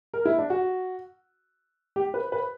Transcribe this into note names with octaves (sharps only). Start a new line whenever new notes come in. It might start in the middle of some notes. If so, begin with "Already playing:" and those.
A#4
E4
D4
F#4
G4
B4
B4